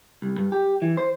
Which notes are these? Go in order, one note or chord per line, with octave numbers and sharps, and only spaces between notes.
C2
G2
G4
E3
C5